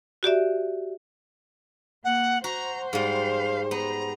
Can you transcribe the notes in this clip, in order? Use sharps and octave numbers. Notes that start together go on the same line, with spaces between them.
F#4 G4 D5 E5
A#3 F#5
F#4 C5 A#5
G#2 G3 F5
B3 A#5